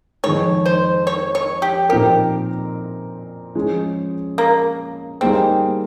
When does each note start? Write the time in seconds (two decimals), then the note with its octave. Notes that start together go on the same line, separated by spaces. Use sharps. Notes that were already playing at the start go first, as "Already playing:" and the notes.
0.24 F2 D#3 G#3 C#5
0.66 C5
1.07 C#5
1.35 C#5
1.62 G4
1.89 A#2 F3 C4 D#4 G4 A#4
3.55 F3 G#3 C#4
4.38 A#3
5.21 G3 A#3 C4 D#4 G#4